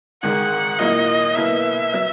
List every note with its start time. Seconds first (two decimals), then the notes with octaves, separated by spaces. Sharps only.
0.23 G#1 G#2 D#3 G#3 F#5
0.79 A#2 F#3 A#3 E4 D#5
1.35 B2 A#3 E4 E5
1.94 F#3